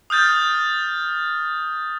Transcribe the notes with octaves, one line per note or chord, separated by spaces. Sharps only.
D#6 F6 G6 A6